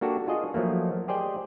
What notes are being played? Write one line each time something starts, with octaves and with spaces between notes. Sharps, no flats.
A#3 D4 F#4 G4 A4
D4 F4 G#4 D#5
F3 F#3 A3 A#3
G4 G#4 C5 D5 D#5 G5